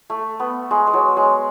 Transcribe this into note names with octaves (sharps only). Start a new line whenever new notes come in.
A3
B3
G#3
G#3
F#3
G#3